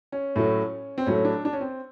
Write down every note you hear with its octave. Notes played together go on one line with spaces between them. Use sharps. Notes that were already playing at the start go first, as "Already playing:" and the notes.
C#4
A2 F#3 A3
C4
A2 F#3 A3 C#4
D4
D4
C#4
C4